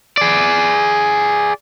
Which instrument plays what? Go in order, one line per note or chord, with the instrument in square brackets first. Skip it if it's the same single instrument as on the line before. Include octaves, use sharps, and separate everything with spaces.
[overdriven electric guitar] G#4 D5